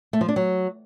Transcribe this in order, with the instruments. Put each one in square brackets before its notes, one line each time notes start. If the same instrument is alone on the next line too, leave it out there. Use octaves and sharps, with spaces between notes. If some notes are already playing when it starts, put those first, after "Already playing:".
[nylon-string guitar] A3
F3
D4
F#3